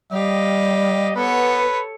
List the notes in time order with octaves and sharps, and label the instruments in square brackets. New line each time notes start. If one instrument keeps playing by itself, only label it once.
[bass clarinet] G3 [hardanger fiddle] G4 F5 [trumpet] D#5
[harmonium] B3 [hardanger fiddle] A4 C#5 [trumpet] B4